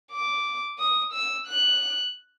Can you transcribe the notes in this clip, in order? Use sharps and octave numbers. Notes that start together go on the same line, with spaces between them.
D6
D#6
E6
F#6